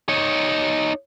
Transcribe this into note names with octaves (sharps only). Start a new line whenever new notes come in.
D#4 C#5